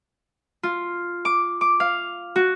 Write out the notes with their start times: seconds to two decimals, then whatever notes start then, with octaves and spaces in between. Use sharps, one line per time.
0.63 F4
1.25 D6
1.61 D6
1.80 F5
2.36 F#4